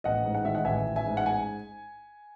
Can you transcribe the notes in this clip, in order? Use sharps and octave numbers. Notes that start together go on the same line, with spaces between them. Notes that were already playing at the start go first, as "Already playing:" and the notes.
A1 D#5 F#5
G#2
F#5
D#3 E5
D#5 F#5
A1 E5 G#5
A1
E5 G#5
G#2
F#5
G#5